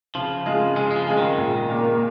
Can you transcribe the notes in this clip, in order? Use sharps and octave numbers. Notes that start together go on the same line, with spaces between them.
C#3 F3
G#3 F4 G#4
C#3 G#3
G#3
F3
G#3 F4 G#4
D#3
A#1
A#2 A#3